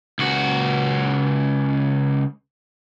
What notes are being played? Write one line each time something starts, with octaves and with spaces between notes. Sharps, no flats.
C#2 F#4